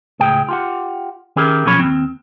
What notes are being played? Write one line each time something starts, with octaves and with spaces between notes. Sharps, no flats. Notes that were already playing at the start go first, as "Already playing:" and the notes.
C#2 A2 G#4 G5
F4 G4 F#5
D#3 C#4 E4 G4 G#4 A#4
B1 A#2 F3 C#4 C#5 B5
D#2 C#3 C4